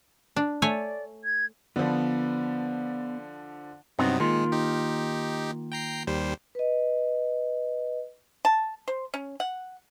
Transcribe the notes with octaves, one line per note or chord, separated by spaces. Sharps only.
D4
A3 C#5 D5 G#5
G#6
D3 F3 B3 B4
G2 C3 F#3 B3 C4 D#4
D#3 G#3 A#3 F4
D#4 G4
G5 A#5 C7
D#2 G3 C5
B4 D#5
A5
C5
C#4
F#5